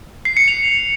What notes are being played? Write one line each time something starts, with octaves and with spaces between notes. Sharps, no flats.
C7
C#7
F7